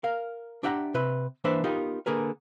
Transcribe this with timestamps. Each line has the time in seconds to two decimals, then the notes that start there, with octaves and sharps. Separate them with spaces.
0.04 A#4 F5
0.63 D4 G4 E5 F#5 A5 A#5
0.94 C3 B4 E5
1.44 E3 A#3 D4 B4 C5 E5
1.64 B3 D#4 F4 G4 A#4
2.06 D3 A#3 G#4 A#4 B4